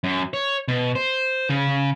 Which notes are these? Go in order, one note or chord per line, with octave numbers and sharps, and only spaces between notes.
F#2
C#5
B2
C5
C#3